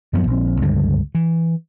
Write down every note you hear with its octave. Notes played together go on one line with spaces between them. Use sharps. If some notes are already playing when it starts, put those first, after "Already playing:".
F#2 F3 B3
A#1 C4
C#2 G2 D3
E3